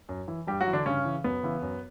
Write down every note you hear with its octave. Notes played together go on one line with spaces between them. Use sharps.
F#2
E3
G2 G3 G4
F#3 F#4
E3
D3 D4
G2 C#3 C#4
E3
F#2 B3
C#3 E3
F#2